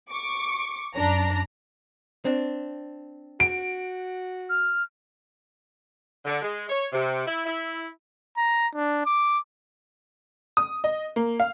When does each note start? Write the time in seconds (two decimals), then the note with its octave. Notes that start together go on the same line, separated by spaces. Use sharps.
0.10 C#6 D6
0.96 F#2 D4 A#5
2.25 C4 D4
3.40 F#4 D7
4.49 F6
6.25 D3
6.42 G#3
6.69 C#5
6.93 C3
7.27 E4
7.46 E4
8.37 A#5
8.75 D4
9.06 D6
10.57 D#6
10.84 D#5
11.16 A#3
11.40 F5